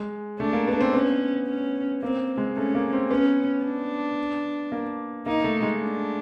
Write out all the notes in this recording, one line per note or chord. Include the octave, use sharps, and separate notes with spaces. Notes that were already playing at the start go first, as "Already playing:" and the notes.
Already playing: G#3
A3 D4
A#3
B3
C4
B3 C#4
C#4
A#3 C4
G#3
A3 C#4
A#3
C4
B3 C#4
D4
A#3
A#3 D#4
A3
G#3
D4